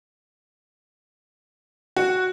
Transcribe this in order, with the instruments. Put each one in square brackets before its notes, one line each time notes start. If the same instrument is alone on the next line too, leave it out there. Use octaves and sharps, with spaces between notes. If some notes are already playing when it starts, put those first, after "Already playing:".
[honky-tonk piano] F#4